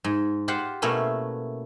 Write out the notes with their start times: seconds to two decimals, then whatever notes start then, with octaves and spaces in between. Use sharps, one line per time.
0.04 G#2
0.48 F4 G4 C5 F#5
0.82 B2 A3 A#3 C#4 E4